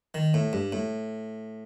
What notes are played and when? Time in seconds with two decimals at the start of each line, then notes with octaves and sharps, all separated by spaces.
0.14 D#3
0.34 A2
0.53 G2
0.72 A2